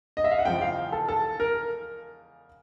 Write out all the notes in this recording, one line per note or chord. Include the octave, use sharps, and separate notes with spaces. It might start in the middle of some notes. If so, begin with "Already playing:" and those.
D#5
E5
F5
F#5
E2 C#3 F3 G#3 G5
F5
A4
A4
A#4